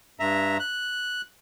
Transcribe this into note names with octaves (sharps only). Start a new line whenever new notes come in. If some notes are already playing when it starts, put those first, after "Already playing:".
G2 E5 A#5
F#6